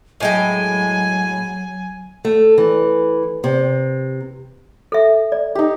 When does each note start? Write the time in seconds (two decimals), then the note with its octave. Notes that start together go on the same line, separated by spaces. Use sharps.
0.20 A2 F#3 G#3 G5 G#5
2.25 A3
2.58 E3
3.44 C3
4.92 A4 E5
5.32 D5
5.55 D#4 G4